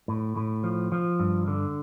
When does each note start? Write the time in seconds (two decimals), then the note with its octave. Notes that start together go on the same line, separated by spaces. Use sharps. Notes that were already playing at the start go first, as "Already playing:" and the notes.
0.08 A2
0.37 A2
0.64 F3
0.92 F3
1.20 G2
1.48 D3